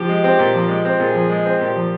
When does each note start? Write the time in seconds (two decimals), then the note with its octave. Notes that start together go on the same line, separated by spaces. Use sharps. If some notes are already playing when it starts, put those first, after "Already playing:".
Already playing: F3 G4
0.09 G#3
0.24 C4
0.39 A#2
0.54 F3
0.69 G#3
0.85 C4
1.00 A#2 G#4
1.14 F3
1.30 G#3
1.45 C4
1.60 A#2 G4
1.76 F3